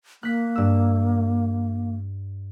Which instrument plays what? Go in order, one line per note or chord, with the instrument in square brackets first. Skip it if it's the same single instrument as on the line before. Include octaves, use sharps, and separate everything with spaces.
[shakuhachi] A#3 [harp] F#6 B6
[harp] G2 E6